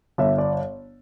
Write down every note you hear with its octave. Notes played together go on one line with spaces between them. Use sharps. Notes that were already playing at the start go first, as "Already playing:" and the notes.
G1 E5
D5